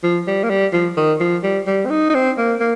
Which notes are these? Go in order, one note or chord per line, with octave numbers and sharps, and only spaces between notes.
F3
G3
A#3
G3
F3
D#3
F3
G3
G3
C4
D#4
D#4
C4
A#3
A#3